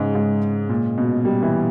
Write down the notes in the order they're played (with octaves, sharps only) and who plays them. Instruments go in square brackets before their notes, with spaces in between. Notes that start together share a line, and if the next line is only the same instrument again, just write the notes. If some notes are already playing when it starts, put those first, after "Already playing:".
Already playing: [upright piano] G#2 [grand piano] C#3 G#3 C#4
[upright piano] G#2
A#2
B2
G3
E3